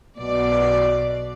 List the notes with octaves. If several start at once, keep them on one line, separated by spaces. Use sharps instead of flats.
B1 B2 D5